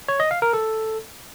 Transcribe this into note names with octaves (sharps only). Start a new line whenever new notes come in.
C#5
D#5
F5
A#4
A4